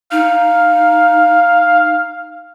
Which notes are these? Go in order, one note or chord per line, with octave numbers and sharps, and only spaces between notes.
D#4 F5